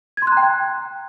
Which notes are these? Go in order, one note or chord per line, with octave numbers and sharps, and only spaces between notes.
G5 A#5 C6 F#6 G#6